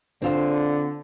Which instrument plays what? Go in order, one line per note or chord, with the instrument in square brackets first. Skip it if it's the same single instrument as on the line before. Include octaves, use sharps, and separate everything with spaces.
[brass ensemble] D3 [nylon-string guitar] C4 F4 C5